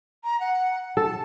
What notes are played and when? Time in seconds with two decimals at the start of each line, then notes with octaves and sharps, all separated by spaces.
0.24 A#5
0.40 F#5
0.97 A4 A5